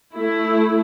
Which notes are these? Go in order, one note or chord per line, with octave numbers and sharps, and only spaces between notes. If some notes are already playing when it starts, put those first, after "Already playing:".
A3 E4